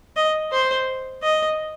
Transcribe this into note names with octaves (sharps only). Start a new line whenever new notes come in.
D#5
C5
D#5